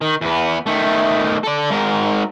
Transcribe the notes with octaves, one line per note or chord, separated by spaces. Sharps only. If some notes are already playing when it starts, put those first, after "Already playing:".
D#3
E2 B3
D#3 A3
A4 D5
G#2 A#4